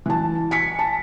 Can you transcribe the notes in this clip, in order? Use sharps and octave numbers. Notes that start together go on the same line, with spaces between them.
E3 A5
G#5 B6 C#7
A5